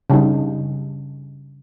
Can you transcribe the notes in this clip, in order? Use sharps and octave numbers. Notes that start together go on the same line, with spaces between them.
C#3 G3 D#4